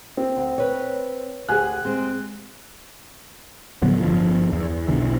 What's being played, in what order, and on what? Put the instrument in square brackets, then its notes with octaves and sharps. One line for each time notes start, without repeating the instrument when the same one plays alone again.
[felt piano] C4
[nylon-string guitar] D2
B4 C#5
[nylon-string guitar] D2 G#4 [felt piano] G4 G#5 F#6
[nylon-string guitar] G#3 C4
[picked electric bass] A2 D3 F#3 B3
G1 F3
E2
B1 D3 E3